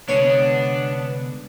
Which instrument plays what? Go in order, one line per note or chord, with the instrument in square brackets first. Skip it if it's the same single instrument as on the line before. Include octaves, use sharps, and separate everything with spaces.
[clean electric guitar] C2 D3 G#3 [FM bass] B3 [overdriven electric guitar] D4 [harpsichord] C#5